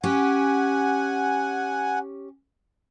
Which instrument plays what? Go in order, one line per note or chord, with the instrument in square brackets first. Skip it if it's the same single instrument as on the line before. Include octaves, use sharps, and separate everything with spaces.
[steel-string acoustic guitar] C#4 G4 [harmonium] F#5 G#5